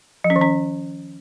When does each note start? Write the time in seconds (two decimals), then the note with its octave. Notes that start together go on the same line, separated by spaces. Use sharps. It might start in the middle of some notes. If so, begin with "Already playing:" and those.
0.24 F3
0.30 C#4
0.36 D#3
0.41 C#4